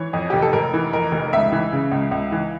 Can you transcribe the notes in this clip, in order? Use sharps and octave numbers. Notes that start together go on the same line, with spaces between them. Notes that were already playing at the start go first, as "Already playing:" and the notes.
Already playing: E3 C#5
F2
F1 G4
A4
F1 A#4
E3
F2 A#4
F1
C#2 E5
E3
C#3
C#2
C#2
E3